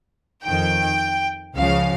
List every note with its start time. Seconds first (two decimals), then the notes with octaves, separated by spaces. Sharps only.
0.46 F2 D#3 G5
1.56 C#2 C#3 F3 F5